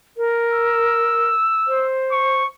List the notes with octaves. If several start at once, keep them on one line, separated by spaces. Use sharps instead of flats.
A#4
E6
C5
C#6